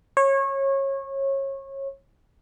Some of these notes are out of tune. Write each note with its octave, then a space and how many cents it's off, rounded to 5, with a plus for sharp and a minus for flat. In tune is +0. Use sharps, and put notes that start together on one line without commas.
C#5 -25